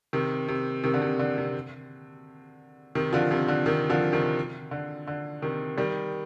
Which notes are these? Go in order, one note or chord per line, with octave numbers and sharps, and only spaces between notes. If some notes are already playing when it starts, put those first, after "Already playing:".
C3 D#3
C3
C3 D#3
D3
C3
D3
C3
C3 D#3
D3 F3
C3 D#3
D3
C3 D#3
D3 F3
C3 D#3
D3
D3
C3 D#3
D#3 G3